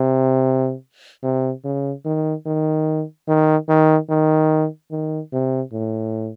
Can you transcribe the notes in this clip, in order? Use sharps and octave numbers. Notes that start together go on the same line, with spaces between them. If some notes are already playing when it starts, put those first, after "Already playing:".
Already playing: C3
C3
C#3
D#3
D#3
D#3
D#3
D#3
D#3
C3
A2